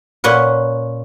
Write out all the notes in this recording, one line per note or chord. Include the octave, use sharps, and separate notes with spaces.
A#2 C#4 B4 F#5